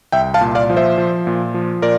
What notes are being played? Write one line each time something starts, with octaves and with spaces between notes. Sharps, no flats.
C2 E5 G5
F5 A5
A#2
D5 F5
F3
C5 E5
F3
A#2
F3
A#2 A#4 D5